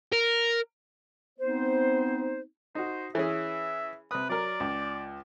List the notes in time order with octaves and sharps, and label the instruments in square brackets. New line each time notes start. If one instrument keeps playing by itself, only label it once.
[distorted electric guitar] A#4
[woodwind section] B3 C4 D#4 C5
[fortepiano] D#4 F#4 [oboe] C5
[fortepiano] E3 C#4 G#4 [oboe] E5
[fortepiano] C3 D#6 [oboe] B4
[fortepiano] F#3 A#4 [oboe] D5
[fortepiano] C#2